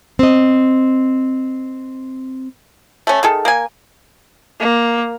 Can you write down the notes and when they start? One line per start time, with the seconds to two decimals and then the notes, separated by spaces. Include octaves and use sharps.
0.19 C4 D#5
3.07 A3 C#4
3.23 D#3 G#4 A4
3.45 A#3 G#5
4.60 A#3